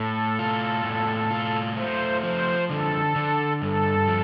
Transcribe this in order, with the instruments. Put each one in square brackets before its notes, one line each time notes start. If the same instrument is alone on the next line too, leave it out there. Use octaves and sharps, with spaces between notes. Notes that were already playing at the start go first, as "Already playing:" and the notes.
Already playing: [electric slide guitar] A2 [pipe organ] A4
[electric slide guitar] F4
A2
F4
[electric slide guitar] A3 [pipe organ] C5
[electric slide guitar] F3 [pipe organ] C5
[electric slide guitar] D3 [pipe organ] A4
[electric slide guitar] D3
[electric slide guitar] G2 [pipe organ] A4
[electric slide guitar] F3